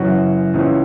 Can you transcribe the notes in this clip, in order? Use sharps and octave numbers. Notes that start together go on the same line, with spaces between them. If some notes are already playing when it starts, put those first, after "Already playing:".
Already playing: F#2 C#3 E3 F#4
C#2 C#3 E3